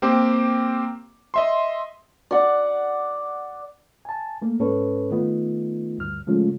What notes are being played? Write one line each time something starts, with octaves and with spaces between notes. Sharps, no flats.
A#3 C4 G4
D#5 E5 C6
D5 F#5
G#5 A5
A3 A#3
G#2 C#4 A4 B4 C#5
D#3 A3 B3 D#4 F4
D2 G2 F6
C#3 F3 G#3 A3 C#4 F4